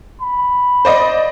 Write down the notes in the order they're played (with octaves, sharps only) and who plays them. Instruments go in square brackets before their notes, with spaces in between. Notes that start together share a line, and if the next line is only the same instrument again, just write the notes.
[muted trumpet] B5
[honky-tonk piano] C5 D5 D#5